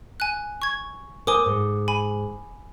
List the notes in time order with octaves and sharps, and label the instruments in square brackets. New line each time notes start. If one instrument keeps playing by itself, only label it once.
[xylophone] G#5 F#6
C#6 G#6
[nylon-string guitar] A#4 C5 G#5 [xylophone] D6 D#6 G7
[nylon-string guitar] G#2
[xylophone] G#5 B5